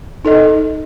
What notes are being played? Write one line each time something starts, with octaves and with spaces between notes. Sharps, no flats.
D#4 A4 D#5